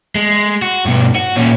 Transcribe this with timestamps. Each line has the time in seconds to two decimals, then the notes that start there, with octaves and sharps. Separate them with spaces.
0.15 G#3
0.62 F#4
0.86 G2 B2
1.16 F#4
1.37 A#2 C#4